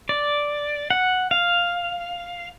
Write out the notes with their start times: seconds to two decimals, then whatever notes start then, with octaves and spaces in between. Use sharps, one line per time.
0.09 D5
0.90 F#5
1.31 F5